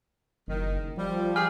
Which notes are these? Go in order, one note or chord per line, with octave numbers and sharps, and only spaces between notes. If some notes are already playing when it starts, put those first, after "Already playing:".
F#1 D#3
F3 G3
G4 G#4 G#5 F6